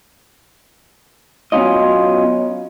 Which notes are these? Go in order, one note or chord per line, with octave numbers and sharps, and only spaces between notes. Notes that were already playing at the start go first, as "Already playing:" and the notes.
F#3 B3 C#4 F4 D#5